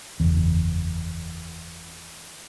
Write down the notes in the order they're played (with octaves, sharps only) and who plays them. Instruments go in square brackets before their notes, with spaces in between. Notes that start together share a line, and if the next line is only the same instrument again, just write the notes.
[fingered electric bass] F#1 E2